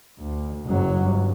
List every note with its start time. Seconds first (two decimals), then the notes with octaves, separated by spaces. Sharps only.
0.19 D2
0.66 F#1 F#3
1.00 G1